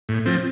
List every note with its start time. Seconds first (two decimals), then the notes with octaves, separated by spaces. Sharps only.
0.09 A2
0.25 F3 C4